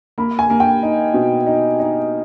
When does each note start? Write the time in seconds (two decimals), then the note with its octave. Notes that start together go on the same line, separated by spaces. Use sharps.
0.18 A#3 B5
0.39 G#5
0.50 A#3
0.60 G5
0.83 D#4
1.14 B2
1.47 D#4
1.79 D#4